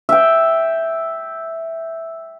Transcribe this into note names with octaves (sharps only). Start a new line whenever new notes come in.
E5 G5